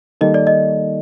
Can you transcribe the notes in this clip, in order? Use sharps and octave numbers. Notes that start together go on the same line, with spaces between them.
D#3 G3 A#3 D#4 A4 D#5
D5
D#5